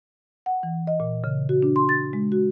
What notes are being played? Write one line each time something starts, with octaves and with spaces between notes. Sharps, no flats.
F#5
E3
D#5
A#2
C#3
F#4
D4
C6
A6
G#3
F#4